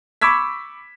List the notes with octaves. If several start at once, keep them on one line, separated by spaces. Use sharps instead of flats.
B5 C#6 D6 E6 G#6 B6